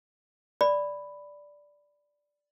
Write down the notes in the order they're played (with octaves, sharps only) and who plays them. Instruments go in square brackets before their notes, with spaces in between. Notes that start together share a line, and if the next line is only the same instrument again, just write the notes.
[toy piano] D5 B5